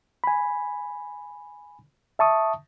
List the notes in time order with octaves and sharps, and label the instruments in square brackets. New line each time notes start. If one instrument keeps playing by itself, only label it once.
[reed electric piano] G#5 B5
E5 A5 C#6 D#6